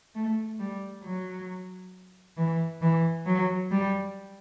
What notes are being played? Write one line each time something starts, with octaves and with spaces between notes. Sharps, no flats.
A3
G3
F#3
E3
E3
F#3
G3